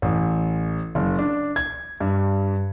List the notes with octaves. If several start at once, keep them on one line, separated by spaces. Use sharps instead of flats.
A1
F#1
D4
G#6
G2